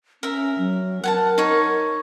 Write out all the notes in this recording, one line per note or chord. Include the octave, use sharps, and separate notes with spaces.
C#4 A#4 E5
F#3
A#4 F#5 G#5 A5
D#4 C#5